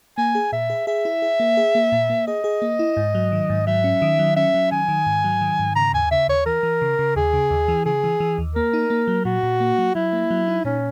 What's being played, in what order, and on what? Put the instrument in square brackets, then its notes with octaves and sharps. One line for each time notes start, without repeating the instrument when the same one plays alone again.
[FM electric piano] A#3 [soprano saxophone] G#5
[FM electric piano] G#4
[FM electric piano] A#2 [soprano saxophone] E5
[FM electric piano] G#4
[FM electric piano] G#4 [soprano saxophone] E5
[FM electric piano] E4
G#4
A#3
G#4
A#3
A#2
A#3
[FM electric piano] G#4 [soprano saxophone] D#5
[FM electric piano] G#4
A#3
E4
G#2
F#3
D#3
G#2
[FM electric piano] F#3 [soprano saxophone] E5
[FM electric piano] C#4
D#3
F#3
[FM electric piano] C#4 [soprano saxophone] E5
[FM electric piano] F#3
[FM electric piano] D#3 [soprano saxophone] G#5
[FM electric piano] D#3
G#2
F#3
D#3
G#2
[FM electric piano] C#3 [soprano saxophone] A#5
[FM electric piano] D#2 [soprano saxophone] G#5
[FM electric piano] C#3 [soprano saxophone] E5
[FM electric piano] D#2 [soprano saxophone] C#5
[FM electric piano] E3 [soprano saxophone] A#4
[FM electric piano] E3
C#3
C#3
[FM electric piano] D#2 [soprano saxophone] G#4
[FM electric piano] C#3
D#2
E3
[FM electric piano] C#3 [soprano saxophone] G#4
[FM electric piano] E3
E3
D#2
[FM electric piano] A#3 [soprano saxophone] A#4
[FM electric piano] D#4
A#3
F#3
[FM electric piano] A#2 [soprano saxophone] F#4
[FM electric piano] A#2
A#3
F#3
[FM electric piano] F#3 [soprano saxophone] E4
[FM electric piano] A#3
F#3
D#4
[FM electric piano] A#2 [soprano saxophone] C#4